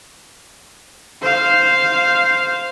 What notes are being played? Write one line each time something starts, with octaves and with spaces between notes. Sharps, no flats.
C5 F5